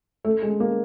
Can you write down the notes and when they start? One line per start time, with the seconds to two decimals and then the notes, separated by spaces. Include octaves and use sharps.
0.25 A3
0.42 G#3
0.60 A#3